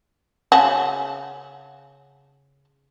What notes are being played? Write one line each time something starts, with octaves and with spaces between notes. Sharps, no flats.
C#3 F#4 A5